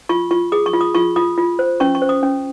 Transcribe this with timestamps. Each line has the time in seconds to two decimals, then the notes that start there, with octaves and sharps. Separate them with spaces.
0.09 F4 C#6
0.31 F4 C#6
0.52 G#4 D#6
0.66 C#6
0.73 F4
0.81 D#6
0.95 F4 C#6
1.16 F4 D#6
1.38 F4
1.59 C5
1.80 C#4 C#6
1.95 C#6
2.02 C5
2.09 D#6
2.23 C#4